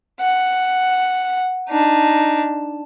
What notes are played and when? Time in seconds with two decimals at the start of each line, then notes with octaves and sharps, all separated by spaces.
0.20 F#5
1.69 D4 D#4